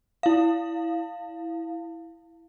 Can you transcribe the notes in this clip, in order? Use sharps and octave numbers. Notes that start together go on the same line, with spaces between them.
E4 F5